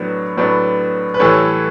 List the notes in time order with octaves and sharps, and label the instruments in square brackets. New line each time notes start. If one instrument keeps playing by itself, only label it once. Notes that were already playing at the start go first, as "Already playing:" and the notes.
Already playing: [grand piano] A2 F#3 B3 D4
A2 F#3 B3 D4
B4
A2 E3 G3 A4 C#5